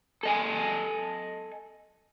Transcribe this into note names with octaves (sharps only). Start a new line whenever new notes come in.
A4 D#5 G#5